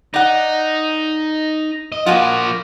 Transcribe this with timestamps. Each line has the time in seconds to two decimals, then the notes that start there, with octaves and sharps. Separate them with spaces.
0.14 D#4 D5 F#5
1.92 D#5
2.06 F3 A#3 F4 F#4 G#5